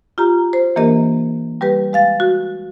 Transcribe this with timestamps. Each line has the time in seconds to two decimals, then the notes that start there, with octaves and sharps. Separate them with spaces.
0.18 F4 G4 A#5
0.53 C5
0.76 E3 A#3 D4 G4 A#4 D#5
1.61 G3 G4 B4
1.93 G#3 F5 A6
2.20 F#4